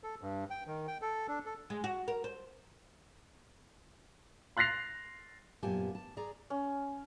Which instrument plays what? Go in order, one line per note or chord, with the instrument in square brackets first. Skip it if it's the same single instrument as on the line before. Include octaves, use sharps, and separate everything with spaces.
[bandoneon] A4
G2
G5
D#3
G5
A4
D4
A4
[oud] G#3
F#4
A#4
C5
[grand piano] C6 F#6 A6 A#6 C7 F7
[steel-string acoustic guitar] F#2 A#2 B3 G4 G#5 A5
A5
G#4 D5 A#5
[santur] C#4